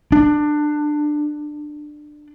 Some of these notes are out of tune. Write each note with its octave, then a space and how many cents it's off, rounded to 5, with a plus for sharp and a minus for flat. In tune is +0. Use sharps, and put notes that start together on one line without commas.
D4 +20